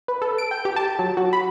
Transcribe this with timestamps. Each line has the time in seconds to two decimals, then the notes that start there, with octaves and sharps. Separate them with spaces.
0.08 B4
0.22 A4
0.38 D7
0.51 G5
0.65 G4
0.76 A5
0.99 F#3
1.17 F#4
1.33 B5